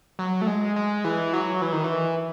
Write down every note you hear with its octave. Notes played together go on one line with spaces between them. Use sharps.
F#3
A3
G#3
G#3
E3
F#3
E3
D#3
E3